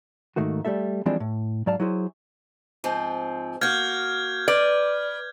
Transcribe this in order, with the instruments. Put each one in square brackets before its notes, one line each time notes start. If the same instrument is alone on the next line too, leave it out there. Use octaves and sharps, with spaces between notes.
[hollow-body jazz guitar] G#2 D#3 A3 A#3 F#4
G3 A3 A4 E5
E3 F3 G3 G#3 C4 D4
A2
G#2 F#3 D5 F5 A5
F#3 E4 G#4 C5
[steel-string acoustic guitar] G#2 F3 C4
[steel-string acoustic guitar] A#3 F#4 [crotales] F6 G6 G#6
[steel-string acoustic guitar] B4 [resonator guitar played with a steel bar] D5